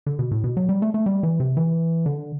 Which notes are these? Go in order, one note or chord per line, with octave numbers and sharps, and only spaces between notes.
D3
B2
A2
B2
F#3
G3
A3
A3
G3
E3
C3
E3
D3